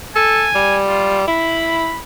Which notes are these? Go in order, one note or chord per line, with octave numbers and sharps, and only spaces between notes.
A4 G#5
G3
F4
E4 B5